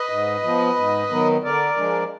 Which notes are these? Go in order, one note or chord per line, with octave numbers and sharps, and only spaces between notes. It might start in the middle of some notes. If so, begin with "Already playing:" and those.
Already playing: B4 D#5
G#2
F3 B3
G#2
D#3 F#3 B3
D3 A#4 D5
F3 G#3 D4